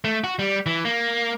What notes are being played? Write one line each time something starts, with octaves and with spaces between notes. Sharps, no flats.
A3
F#4
G3
E3
A#3